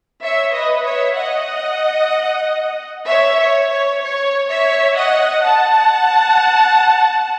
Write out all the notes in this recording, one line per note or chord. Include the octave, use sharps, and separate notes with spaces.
C#5 E5
B4 D#5
C#5 E5
D#5 F#5
C#5 E5
C#5
C#5
C#5
C#5 E5
D#5 F#5
F#5 A5